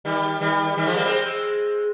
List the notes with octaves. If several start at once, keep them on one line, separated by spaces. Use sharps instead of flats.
D#3 G3
D#3 G3
D#3 G3
F3 G#3
G3 A#3
G#3 C4